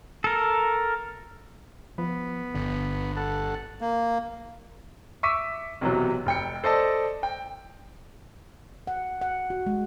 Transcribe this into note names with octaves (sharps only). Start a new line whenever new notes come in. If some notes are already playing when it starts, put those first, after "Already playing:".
A4 A#4
F3 B3
G1 D3
A4 F#5
A#3
E5 C#6 D6 E6 B6 D#7
B1 C3 E3 F#3
F1 G5 C#7
A4 C5 D5 D#5 A5
G5
F#5
F#5
F#4
G#3